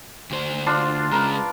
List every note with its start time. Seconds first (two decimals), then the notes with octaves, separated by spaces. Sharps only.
0.31 D2 C5
0.67 D4 F4 C6
1.12 C#3 G#3 A#4 B4